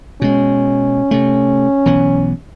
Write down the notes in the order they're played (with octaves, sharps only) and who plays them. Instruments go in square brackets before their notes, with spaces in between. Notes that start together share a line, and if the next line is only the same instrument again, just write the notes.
[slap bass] B2 G#3 [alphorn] C#4
[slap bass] C3 A3
B1 E3 B3